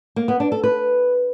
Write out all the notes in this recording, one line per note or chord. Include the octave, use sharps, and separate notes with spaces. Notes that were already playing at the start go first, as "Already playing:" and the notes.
A#3
B3
D4
A4
B4